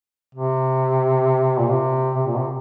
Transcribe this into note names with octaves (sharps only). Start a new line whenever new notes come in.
C3
A#2
C3
C3
A#2
C3